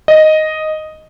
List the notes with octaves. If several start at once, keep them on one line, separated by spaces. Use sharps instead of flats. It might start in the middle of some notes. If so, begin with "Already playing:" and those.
D#5